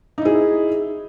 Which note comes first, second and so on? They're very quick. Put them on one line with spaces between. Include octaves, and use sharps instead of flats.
D#4 E4 G#4